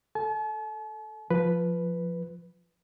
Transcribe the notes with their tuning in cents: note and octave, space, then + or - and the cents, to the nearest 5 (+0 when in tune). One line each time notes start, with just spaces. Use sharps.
A4 +0 A5 -45
F3 +0 B4 +0